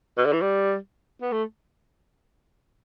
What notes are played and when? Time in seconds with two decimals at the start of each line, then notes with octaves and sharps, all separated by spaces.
0.18 B2
0.25 D3
0.33 E3
0.41 G3
1.21 B3
1.32 A3